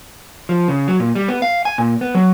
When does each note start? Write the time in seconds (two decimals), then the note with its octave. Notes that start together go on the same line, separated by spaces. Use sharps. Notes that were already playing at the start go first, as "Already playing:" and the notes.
0.49 F3
0.68 C#3
0.88 F#3
1.00 A#2
1.15 G3
1.28 B3
1.42 F5
1.65 G#5
1.78 A#2
2.01 B3
2.15 F#3